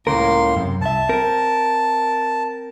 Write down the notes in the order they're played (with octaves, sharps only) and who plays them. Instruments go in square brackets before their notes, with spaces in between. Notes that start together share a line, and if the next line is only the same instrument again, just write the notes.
[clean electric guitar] C#2 C#3 A#4 [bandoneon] A2 A#3 C6
[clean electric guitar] F#2 C3
[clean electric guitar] C2 E5 [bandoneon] A5
[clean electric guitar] C4 A#4